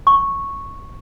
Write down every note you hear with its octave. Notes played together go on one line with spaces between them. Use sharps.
C#6